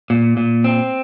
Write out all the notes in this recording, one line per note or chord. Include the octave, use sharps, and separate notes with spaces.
A#2
A#2
C4